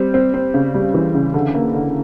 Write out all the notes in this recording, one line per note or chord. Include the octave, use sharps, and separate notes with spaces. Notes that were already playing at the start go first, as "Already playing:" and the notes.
Already playing: G3 C4
C4
C4
C#3
G3
E3
C#3
D3
A#3
D3